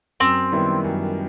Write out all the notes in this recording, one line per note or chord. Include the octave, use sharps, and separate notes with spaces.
F#2 C4
D#3 G3 B3 E4
F#2